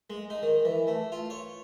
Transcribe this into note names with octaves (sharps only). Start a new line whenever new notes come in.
G#3
D#4
D#3
E3
A3
F4
C#5